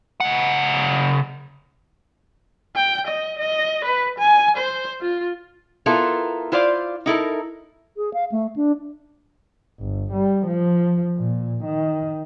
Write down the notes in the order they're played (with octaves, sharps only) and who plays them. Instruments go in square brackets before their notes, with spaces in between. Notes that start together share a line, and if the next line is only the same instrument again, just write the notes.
[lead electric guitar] C#3 F#5
[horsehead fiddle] G5
D#5
D#5
B4
G#5
C5
F4
[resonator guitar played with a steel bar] B3 E4 F4 A4 A#4
E4 F4 C5 D5 F5
D#4 E4 A4 A#4
[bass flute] G#4
F5
A3
D4
[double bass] G1
G3
F3
A#2
D#3